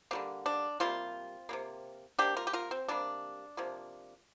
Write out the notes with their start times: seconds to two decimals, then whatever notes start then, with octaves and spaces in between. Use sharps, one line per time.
0.11 D3 G3 A#3 C4
0.46 D4
0.80 C3 G3 A#3 C4 F4
1.49 C3 G3 A#3
2.19 C3 G3 A#3 D4 G4
2.36 F4 A#4
2.47 G4
2.53 F4 A#4
2.71 C4
2.88 C3 G3 A#3 D4
3.57 C3 F3 A#3